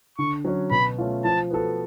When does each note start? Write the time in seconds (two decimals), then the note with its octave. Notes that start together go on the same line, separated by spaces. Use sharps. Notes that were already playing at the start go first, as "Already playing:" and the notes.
0.18 D3 C#6
0.45 F#3 C#4
0.71 B2 B5
0.98 A3 C#4 F4
1.24 F3 A5
1.50 B3 F#4 A4